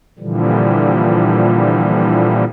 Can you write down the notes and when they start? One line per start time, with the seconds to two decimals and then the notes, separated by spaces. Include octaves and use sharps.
0.19 A#2 D3 E3 F3 G3